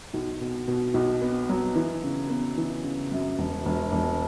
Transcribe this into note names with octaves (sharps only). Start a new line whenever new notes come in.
B1
B2
B2
B1
B3
F#3
E3
C#3
B3
E3
C#3
F#2
E1
E1
E1